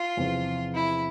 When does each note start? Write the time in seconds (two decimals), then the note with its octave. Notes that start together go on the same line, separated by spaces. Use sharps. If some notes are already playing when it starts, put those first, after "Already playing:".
Already playing: F4
0.17 E2 C3 F3 C4
0.75 E4